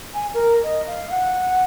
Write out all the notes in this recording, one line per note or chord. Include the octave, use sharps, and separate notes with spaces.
G#5
A#4
D#5
F5
F#5